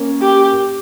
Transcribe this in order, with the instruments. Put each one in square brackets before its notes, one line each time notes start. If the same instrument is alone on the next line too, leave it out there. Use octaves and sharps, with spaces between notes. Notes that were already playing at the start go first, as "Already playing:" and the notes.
Already playing: [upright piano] A#3 C#4
[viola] G4